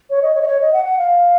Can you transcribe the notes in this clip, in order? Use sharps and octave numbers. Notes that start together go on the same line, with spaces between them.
C#5
D#5
C#5
D#5
C#5
D#5
F#5
F#5
F5